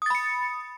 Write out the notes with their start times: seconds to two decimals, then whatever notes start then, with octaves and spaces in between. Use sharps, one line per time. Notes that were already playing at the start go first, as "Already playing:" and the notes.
0.02 D#6
0.06 A6
0.10 B5
0.15 C#7